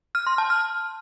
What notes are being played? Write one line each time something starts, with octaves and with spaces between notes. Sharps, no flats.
F6
C6
A5
F6